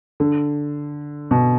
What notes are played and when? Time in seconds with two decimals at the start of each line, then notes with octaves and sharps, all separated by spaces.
0.20 D3
1.31 B2